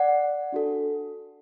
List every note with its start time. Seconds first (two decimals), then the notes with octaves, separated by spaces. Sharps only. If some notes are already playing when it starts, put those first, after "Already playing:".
Already playing: D5 F#5
0.52 D4 F#4 A4